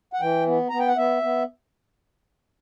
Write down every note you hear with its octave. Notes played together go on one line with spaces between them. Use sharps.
F#5
E3 G5
B3
B3 A#5
G5
F#5
B3 E5
B3